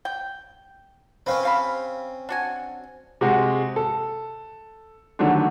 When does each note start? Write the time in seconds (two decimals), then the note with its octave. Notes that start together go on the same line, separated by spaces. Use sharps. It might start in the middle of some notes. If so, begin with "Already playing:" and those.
0.05 G5
1.26 C4 C#4 B4 F5
1.43 C3 F5 B5
2.29 D4 F#4 G#5
3.21 C3 G#3 F#4
3.76 A4
5.19 D3 D#3 F#3 G3 A3 D4